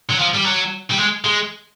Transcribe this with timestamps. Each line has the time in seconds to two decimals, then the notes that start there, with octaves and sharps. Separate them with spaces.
0.10 F#3
0.19 F3
0.34 G3
0.45 F#3
0.91 G3
0.98 G#3
1.25 G#3